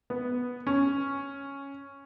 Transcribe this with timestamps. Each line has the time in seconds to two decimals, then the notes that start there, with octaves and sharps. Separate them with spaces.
0.10 B3
0.67 C#4